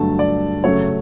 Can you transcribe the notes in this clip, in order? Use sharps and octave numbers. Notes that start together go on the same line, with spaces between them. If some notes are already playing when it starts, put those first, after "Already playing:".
Already playing: G2 D3 F#3 A3 A5
D5
F#2 C#3 F#3 A3 C#5